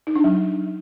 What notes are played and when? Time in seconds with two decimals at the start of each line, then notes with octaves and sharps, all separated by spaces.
0.07 D#4
0.16 D4
0.24 F#3